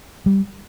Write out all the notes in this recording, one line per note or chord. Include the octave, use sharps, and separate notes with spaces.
G3